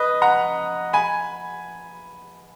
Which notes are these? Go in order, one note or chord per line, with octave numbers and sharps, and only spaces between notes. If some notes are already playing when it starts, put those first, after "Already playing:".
Already playing: B4 D#5
F#5 A#5
G#5 B5